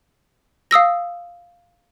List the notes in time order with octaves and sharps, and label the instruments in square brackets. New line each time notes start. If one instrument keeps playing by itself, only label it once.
[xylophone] F5 D#6 E6 A#6